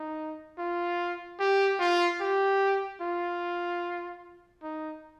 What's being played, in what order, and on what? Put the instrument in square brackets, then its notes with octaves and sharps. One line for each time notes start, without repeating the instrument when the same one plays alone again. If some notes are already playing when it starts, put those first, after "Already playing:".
Already playing: [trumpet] D#4
F4
G4
F4
G4
F4
D#4